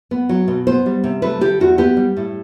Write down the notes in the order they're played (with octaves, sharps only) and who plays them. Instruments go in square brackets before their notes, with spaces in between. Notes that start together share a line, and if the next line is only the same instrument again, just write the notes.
[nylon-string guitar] B3
F#3
B2
B3 C5
G3
C3
A3 B4
D3 G4
E2 F#4
B3 G4
G3
A2